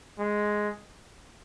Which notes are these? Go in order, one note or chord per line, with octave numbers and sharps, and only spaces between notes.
G#3